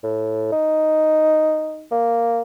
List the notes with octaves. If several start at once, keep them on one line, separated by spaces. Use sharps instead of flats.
A2
D#4
A#3